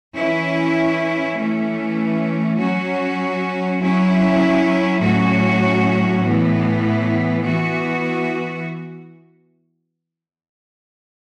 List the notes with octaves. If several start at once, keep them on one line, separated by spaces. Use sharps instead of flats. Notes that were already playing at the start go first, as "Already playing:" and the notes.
E3 C#4 E4
E3 A3 C#4
F#3 C#4 F#4
F#3 C#4 E4
A2 F#3 C#4 F#4
A2 E3 B3
E3 B3 F#4